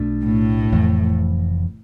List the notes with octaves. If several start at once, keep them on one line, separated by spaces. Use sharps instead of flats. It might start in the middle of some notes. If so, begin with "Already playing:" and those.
Already playing: B1 B2 A3 D4
A2
F1 F2 E3